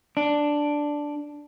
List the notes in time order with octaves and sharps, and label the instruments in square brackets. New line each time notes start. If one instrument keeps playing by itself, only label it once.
[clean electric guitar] D4